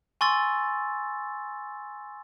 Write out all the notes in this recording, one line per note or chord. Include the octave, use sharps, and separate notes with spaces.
G#5 C6 C#6 E6 A6